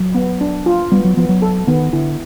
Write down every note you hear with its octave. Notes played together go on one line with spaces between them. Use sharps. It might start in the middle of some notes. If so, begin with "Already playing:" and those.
Already playing: F#3
B3
D4
F4
G3 B3
F#3
F3 B3
F#3
A4
D#3 B3
D3 E4